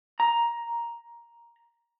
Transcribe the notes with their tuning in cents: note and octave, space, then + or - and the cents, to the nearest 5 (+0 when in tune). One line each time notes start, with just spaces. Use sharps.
A#5 +10